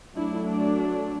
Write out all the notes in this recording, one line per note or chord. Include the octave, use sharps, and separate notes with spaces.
F#3 A3 D4 E4
D4